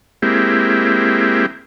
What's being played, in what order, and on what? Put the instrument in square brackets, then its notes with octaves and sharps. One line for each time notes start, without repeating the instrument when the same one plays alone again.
[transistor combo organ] G#3 A#3 C4 E4 G4